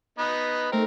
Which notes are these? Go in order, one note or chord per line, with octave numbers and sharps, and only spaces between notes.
B3 D#4 B4
A3 C4 D#4 A#4